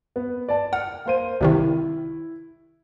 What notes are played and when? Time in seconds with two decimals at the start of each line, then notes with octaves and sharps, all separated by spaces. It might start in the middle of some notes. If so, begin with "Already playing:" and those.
0.16 B3
0.49 D5 A5
0.73 F#5 F6
1.06 A#3 C5 D#7
1.41 C2 C3 D#3 E4